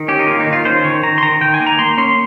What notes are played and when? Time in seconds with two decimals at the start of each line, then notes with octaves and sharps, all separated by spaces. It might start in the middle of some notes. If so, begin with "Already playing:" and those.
Already playing: D#3
0.08 C#4 G4
0.19 D#4
0.27 A#3 F4
0.40 D#4
0.47 D#3
0.53 F4
0.65 C#4 C5
0.84 D#3 C#5
1.03 D#3 A#5
1.18 C6
1.22 D#3 A#5
1.41 D#3 G5
1.54 G#5
1.60 A#3
1.67 A#5
1.79 A#3 C6
1.97 C#4 C6